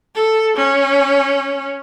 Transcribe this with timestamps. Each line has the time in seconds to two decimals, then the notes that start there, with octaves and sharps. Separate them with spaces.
0.15 A4
0.57 C#4